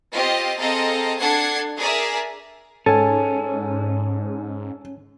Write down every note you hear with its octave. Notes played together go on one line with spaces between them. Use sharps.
C4 F4 G4 D#5
C4 G#4 A4 D#5 F5 A#5
D4 A4 F#5 G#6 C7
G#4 A#4 D5 E5 G#5
G#2 C#4 A4 G#5 A5